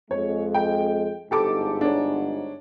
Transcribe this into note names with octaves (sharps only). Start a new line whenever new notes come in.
F2 G#3 C#5
G5
G1 G#2 G4 A4 D6
D4 C#5